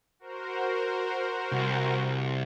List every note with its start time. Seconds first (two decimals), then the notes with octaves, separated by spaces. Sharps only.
0.19 F#4 A#4 C5
1.52 C2